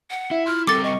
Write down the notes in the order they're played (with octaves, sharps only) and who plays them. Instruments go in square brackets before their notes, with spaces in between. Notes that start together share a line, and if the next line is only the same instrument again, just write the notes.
[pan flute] F#5
[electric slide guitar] E4 [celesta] E5
[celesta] F4 C6 [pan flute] F6
[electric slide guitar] G3 C4 A#4 [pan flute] A4 [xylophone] D6 A6 [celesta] G7
[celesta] D#5 C#7 [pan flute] C#6